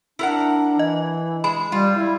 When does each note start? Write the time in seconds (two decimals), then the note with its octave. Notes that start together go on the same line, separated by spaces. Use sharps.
0.19 D4 E4 A#4 F#5
0.79 E3 D#5
1.44 G#3 B5
1.72 G3 F4
1.96 E4